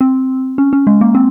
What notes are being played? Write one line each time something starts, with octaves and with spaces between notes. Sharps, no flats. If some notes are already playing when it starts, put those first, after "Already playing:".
C4
C#4
C#4
G#3
A#3
C4